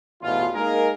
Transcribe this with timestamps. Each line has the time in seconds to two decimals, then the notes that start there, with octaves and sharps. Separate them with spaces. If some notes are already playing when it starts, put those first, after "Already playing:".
0.22 A1 E2 B2 F4
0.54 G#3 A#3 D#4 G#4 A#4